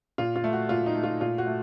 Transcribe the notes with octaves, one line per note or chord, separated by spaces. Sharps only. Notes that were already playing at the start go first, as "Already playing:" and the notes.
A#2 F4
F4
A3
F#4
A#2 F4
D#4
A3
F4
A#2 F4
F#4
A3